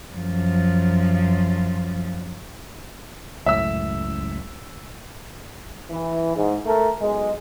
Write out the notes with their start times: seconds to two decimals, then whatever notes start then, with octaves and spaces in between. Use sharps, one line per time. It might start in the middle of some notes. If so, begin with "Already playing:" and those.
0.15 F#2 F3
3.46 C#2 F#2 A2 E5 E6
5.90 E3
6.35 G#2
6.65 A3 A4 A#4
6.99 B1 G#3